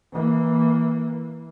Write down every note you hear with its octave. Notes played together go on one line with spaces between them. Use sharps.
E3 A#3